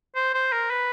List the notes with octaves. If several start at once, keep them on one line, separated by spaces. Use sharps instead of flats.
C5
C5
A#4
B4